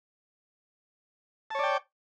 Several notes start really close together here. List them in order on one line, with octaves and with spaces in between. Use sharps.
A5 C#5 D5 G5